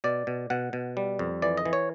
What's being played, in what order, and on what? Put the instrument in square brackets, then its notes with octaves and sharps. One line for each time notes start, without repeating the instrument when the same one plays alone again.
[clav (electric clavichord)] B2 D5
B2
B2 F#5
B2
G3
F2
E3 D5
D#5
E3
C#5